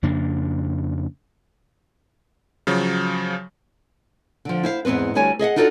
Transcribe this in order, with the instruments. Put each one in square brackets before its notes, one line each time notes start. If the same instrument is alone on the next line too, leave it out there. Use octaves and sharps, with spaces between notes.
[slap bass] F2 C#3 A#3 D4
[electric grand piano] C#3 F3 F#3
[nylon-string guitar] D3 F3
E4 C5 F5
E2 G#2 B3 C4 B4
D2 D3 G3 C#5 G#5
G#4 D#5 E5 F#5
D4 D#4 F4 F#4 A4 D5